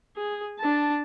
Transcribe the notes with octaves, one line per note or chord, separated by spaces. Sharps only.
G#4
D4 A5